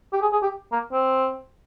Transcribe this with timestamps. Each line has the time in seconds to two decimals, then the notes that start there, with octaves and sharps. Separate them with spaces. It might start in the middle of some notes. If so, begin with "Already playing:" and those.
0.13 G4
0.22 G#4
0.32 G#4
0.43 G4
0.72 A#3
0.92 C4